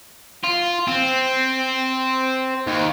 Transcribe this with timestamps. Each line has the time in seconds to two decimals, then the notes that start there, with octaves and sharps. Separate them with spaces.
0.44 F4
0.88 C4
2.67 D#2